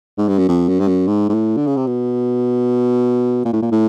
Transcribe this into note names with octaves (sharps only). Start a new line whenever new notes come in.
G#2
G2
F#2
F2
F#2
G2
F#2
G#2
G#2
A2
D3
C#3
C3
B2
A#2
A2
A#2
A2